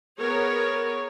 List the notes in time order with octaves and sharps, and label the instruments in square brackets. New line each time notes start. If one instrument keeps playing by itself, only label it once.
[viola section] B3 G#4 A#4 C#5